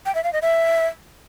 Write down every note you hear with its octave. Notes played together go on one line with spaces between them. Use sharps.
G5
E5
F5
D#5
E5